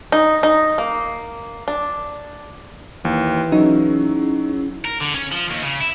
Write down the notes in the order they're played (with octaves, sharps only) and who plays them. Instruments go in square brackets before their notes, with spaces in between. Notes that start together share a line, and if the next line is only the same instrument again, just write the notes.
[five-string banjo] D#4
D#4
A#3
D4
[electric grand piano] D#2 [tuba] E3
[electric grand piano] F#3 [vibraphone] C#4 E4 G#4 [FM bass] D#4
[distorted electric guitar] A#4
D3
C#4
F3
D#2
C#3
E4